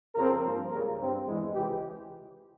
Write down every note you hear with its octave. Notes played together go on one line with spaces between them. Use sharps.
F2 C#3 F3 C4 A#4
G2 F3 A#3
C#2 C#3 G3 A#3 A#4
G2 G3 C4
E2 E3 G#3
C#2 C3 E3 G#3 G4